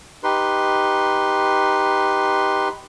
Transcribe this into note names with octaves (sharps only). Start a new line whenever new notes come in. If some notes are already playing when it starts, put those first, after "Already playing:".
D#4 G4 B4 C6